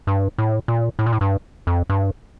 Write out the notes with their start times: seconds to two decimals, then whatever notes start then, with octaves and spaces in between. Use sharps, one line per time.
0.07 G2
0.38 A2
0.68 A#2
0.99 A2
1.06 A#2
1.13 A2
1.21 G2
1.67 F2
1.90 G2